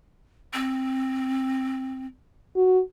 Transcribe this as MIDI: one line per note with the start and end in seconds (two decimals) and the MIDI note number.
0.54 2.06 60
2.56 2.81 66